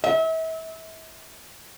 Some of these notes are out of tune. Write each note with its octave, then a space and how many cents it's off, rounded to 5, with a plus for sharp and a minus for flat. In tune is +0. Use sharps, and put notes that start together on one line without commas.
E5 -35